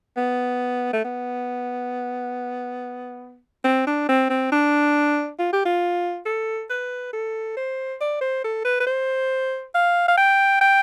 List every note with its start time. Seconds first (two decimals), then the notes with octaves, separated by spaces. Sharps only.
0.17 B3
0.93 A3
1.04 B3
3.64 C4
3.87 D4
4.08 C4
4.29 C4
4.52 D4
5.39 F4
5.52 G4
5.65 F4
6.25 A4
6.70 B4
7.13 A4
7.56 C5
8.00 D5
8.21 C5
8.44 A4
8.65 B4
8.80 B4
8.87 C5
9.75 F5
10.08 F5
10.17 G5
10.61 G5